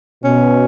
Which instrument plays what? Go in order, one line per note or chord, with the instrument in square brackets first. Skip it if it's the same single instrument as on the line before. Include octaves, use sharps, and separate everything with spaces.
[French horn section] B2 [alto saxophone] C#4